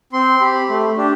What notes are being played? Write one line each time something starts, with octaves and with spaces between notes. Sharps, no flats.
C4 C6
G4 B5
A3
D4 G4